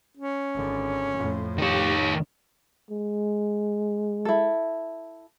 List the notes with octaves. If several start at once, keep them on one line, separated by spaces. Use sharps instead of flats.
C#4
G#1 D3
F2 A2
D#3 G4 C#5
G#3
E4 A4